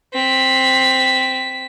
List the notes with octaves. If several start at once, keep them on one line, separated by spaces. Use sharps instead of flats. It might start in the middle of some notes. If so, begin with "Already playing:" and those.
C4 B6